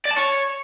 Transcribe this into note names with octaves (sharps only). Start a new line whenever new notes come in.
D5
A5
C#5